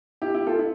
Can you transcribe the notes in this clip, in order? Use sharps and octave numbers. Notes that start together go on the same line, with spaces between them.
E4 G4
E4 G4
F4 A4
E4